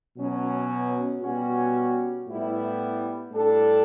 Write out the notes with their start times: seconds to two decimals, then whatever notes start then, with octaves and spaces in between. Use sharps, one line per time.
0.17 B2 F#3 C#4
1.21 B2 G3 C#4 F#4
2.27 A2 G3 B3 E4
3.31 A2 G3 D4 A4